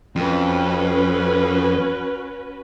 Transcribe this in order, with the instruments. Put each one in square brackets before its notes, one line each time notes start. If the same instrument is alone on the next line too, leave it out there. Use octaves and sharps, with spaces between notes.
[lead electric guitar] F2 [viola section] C#4 F#4 B4